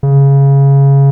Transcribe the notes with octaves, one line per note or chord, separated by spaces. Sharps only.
C#3